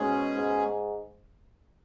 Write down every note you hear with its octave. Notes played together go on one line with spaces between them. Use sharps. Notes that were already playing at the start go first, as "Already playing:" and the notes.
Already playing: G#2 B2 G#3 C#4 G#4
G#2